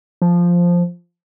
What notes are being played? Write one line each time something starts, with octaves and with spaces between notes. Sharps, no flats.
F3